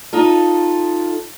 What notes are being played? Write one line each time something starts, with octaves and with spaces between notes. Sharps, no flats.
D#4 F4 A4